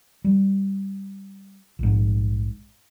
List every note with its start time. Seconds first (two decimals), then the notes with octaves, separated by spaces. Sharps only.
0.24 G3
1.79 A#1 G#2